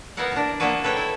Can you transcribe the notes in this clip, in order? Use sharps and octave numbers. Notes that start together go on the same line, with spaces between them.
B3 E4 A#4 F5 F#5
D4 A#4
A#3 B3 D4 E4 F#4 B4
A4 B4 C#5 G5
E4